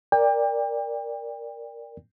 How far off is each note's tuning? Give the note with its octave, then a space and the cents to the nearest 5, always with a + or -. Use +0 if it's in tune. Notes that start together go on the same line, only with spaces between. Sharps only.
A#4 +0 D5 +0 G5 +35